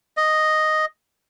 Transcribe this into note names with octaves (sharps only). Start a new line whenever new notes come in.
D#5